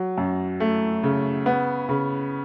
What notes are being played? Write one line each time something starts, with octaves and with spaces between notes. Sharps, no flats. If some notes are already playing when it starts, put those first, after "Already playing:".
Already playing: F#3
F#2
A3
C#3
B3
C#3